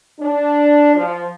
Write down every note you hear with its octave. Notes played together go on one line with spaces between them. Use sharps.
D4
F3